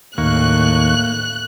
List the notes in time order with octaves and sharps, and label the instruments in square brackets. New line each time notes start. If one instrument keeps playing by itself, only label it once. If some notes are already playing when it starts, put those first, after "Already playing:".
[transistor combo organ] D#2 C#6 [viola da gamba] A2 [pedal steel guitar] A#3 [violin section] F#6